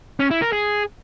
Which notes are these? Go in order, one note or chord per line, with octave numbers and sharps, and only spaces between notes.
C#4
E4
A#4
G#4